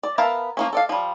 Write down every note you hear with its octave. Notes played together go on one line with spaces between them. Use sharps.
D5
B3 A#4 E5 F5 A5
F3 A#3 C#4
A4 D5 F5
F3 G3